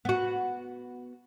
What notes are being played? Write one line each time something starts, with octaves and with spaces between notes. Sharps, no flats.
B3 F#4